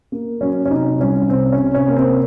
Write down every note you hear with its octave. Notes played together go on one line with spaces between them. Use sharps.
A#3
F#3 C#4
C#4
C3 D#4
C2 C#4
C3 C4
C#4
C3
C#4
A#3
C4